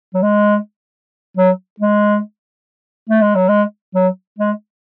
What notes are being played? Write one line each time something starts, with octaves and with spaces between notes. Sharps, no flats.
F#3
G#3
F#3
G#3
A3
G#3
F#3
G#3
F#3
G#3